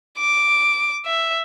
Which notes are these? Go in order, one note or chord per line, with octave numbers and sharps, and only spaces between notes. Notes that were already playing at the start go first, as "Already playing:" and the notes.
D6
E5